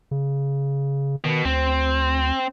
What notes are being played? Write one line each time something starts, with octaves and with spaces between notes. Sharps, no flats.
C#3
B2 D#3
D2 C4